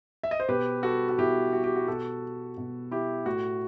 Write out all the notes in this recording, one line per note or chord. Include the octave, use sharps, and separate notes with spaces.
E5
D#5
C5
B2 G4 B4
F#4 A4
F#4
B2 E4 G4
F#4
G4
F#4
B2 F#4 A4
B2
E4 G4
A2 F#4